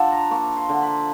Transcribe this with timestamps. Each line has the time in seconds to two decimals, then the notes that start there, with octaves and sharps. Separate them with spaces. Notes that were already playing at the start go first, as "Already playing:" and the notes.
Already playing: F3 D4 E5 F#5
0.12 A#5
0.31 A#3 C#6
0.57 C6
0.69 D3
0.82 B5